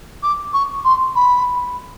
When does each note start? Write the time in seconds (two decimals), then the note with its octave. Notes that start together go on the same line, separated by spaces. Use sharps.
0.23 D6
0.53 C#6
0.84 C6
1.15 B5